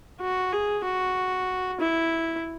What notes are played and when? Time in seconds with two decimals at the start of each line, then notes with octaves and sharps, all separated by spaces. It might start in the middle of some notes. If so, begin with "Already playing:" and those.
0.21 F#4
0.52 G#4
0.84 F#4
1.81 E4